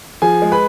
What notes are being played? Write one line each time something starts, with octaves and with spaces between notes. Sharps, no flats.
F3 G#4 G#5
G#3
B4 B5